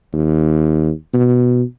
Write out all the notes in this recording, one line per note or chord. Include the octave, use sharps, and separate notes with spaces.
D#2
B2